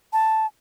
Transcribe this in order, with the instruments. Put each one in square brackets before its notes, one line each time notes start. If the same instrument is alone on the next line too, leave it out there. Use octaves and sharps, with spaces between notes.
[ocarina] A5